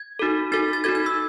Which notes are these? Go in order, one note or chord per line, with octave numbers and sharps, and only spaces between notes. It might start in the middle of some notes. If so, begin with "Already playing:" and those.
Already playing: G#6
D#4 F#4 A4
D#4 F#4 A4 A6
A6
D#4 F#4 A4 G#6
G#6
E6